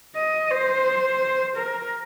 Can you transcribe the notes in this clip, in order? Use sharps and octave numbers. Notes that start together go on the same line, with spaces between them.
D#5
C5
A#4